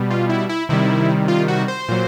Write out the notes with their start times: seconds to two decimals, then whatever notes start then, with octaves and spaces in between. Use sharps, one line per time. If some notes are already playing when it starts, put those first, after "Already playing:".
Already playing: B2 G3
0.10 F4
0.29 E4
0.49 E4
0.69 C3 D#3 G3 E4
1.28 F4
1.48 F#4
1.68 C5
1.89 A#2 F#3